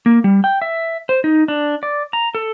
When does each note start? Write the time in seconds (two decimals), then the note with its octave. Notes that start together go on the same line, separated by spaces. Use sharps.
0.06 A#3
0.24 G3
0.44 G5
0.62 E5
1.09 C5
1.24 D#4
1.48 D4
1.83 D5
2.13 A#5
2.35 A4